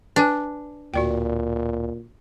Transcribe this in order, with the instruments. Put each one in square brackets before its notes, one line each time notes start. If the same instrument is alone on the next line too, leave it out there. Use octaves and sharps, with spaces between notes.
[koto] D4 [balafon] B4 G#5
[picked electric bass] D1 [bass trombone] A#2 [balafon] F#4 D5 G5